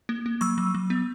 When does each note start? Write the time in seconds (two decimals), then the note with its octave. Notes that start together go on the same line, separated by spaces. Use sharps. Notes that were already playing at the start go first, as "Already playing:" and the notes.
0.09 A#3
0.26 A#3
0.41 F#3 C#6 E6
0.58 F#3
0.75 F#3
0.90 B3